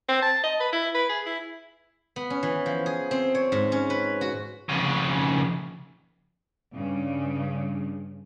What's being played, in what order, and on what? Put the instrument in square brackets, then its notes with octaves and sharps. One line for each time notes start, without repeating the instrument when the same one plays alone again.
[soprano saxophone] C4
A5
D#5
B4
E4
B4
G#4
E4
[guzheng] B3
C#4
E3
F3
G#4
C4
C#5
G#2
C#4
B4
F#4
[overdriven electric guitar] F2 C#3
[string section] G2 C#3